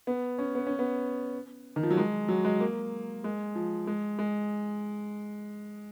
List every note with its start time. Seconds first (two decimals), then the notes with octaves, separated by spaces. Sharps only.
0.07 B3
0.38 C#4
0.55 B3
0.67 C#4
0.79 B3
1.76 D#3
1.83 F3
1.90 F#3
1.97 G#3
2.28 F#3
2.44 G#3
2.60 A#3
3.24 G#3
3.55 F3
3.87 G#3
4.19 G#3